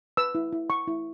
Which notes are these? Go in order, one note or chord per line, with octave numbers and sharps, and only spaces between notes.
B4 E6
E4
E4
E4 C#6
E4